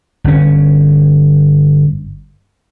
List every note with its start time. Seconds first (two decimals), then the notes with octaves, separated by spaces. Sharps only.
0.24 G1 C#4